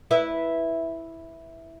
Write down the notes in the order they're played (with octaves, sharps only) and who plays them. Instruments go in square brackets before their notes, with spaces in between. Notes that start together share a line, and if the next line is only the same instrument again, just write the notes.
[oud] E4 B4 E5